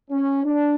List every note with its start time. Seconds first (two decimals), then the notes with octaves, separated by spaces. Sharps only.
0.11 C#4
0.45 D4